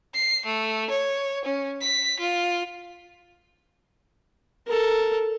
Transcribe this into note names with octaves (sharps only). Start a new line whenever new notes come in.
C7
A3
C#5
C#4
B6
F4
A4 A#4